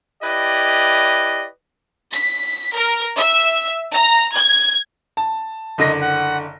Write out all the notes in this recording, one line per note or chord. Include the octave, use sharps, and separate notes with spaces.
E4 G4 B4 D5 D#5
B6
A#4
E5
A#5
G#6
A5
F#1 D3 D#5 A#6
F#5